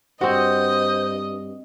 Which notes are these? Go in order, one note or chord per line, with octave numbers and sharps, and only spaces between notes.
G2 C4 F#4 C5 D#5